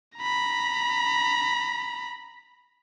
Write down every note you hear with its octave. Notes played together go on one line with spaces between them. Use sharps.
A#5 B5